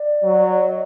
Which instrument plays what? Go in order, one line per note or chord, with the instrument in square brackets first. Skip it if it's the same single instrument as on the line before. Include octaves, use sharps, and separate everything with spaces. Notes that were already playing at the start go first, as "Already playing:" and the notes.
Already playing: [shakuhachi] D5
[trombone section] F#3
[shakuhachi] D#5